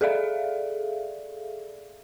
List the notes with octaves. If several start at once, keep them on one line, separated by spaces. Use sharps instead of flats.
G#4 A4 D5 E5 F5